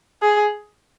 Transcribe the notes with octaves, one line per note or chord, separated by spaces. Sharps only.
G#4